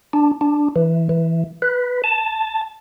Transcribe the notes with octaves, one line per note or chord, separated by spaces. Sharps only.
D4
D4
E3
E3
B4
A5